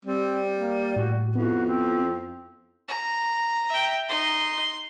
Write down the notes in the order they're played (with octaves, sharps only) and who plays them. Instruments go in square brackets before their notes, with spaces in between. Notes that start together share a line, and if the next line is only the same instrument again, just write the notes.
[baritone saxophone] G3 [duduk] C4
[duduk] A#3
[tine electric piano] A2 [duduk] F#4
[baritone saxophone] F2 [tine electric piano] B3 E4 [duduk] F#4
[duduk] C4
[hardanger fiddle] A#5
[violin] E5 G5
[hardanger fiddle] D#4 [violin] C6